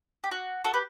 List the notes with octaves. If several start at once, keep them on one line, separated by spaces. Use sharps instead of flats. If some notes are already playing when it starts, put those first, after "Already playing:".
G4
F#4
F#4 A4
G4 B4